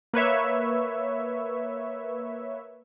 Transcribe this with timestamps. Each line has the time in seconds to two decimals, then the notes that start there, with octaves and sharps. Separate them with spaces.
0.14 A#3 B4 C#5 E5